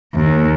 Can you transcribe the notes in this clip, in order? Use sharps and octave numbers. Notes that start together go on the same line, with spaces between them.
D#2